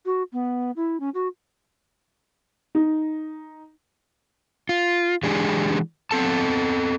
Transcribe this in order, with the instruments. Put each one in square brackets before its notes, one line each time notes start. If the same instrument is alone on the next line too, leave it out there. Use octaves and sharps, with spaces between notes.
[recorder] F#4
B3
E4
C#4
F#4
[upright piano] D#4
[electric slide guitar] F4
E3 G#3 D4 G4 G#4
B3 C4 A4 A5